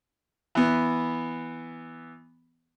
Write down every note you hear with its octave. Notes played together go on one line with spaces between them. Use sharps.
E3 B3